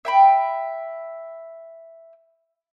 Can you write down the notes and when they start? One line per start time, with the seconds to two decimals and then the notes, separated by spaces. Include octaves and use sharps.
0.05 E5 G5 B5